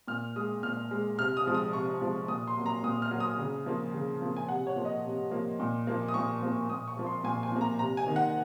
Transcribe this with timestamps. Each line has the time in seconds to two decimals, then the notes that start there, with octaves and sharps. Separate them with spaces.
0.08 A#2 F6
0.36 G#3 D#6
0.63 A#2 F6
0.91 G#3
1.18 C3 F6
1.37 D#6
1.46 F3 G#3
1.54 D#6
1.73 C3 C#6
2.01 F3 G#3
2.28 A#2 D#6
2.47 C6
2.56 F#3 A#3
2.66 A#5
2.83 A#2 D#6
3.02 F6
3.11 F#3 A#3
3.20 D#6
3.39 C#3
3.66 F3 A#3
3.94 C#3
4.22 F3 A#3
4.36 G#5
4.48 C3 F#5
4.67 C#5
4.76 F3 A#3
4.85 D#5
5.04 C3
5.31 F3 A#3
5.60 A#2
5.87 F3 A#3
6.08 D#6
6.14 A#2 C#6
6.42 F3 A#3
6.69 A#2 D#6
6.88 C#6
6.97 F3 A#3
7.06 C6
7.24 A#2 G#5
7.43 G#5
7.52 F3 A#3
7.61 A#5
7.79 C3 A#5
7.97 G#5
8.06 D#3 A#3
8.16 F#5